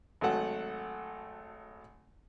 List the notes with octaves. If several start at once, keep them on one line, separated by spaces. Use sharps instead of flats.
G#1 F#3 A3 A4 F#5